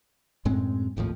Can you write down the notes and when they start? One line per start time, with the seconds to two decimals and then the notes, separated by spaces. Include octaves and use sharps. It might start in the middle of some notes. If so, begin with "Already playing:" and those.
0.45 F#2 A2 G#3 C4
0.97 G#1 D#2 A2 F3